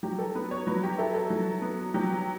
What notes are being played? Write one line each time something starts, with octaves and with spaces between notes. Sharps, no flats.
F#3 G4
A4
B3 B4
C#5
F#3 B4
G4
E4 A4
A4
F#3
B3
F#3 G4